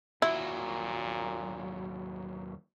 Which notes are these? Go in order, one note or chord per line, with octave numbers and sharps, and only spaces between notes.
D#2 A#2 F#3 E4